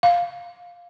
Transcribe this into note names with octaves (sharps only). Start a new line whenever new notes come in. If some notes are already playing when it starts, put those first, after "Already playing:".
F5